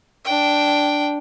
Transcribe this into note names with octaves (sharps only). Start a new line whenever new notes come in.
D4 G5